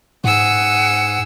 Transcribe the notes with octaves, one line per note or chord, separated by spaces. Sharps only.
G#2 G#4 F#5 E6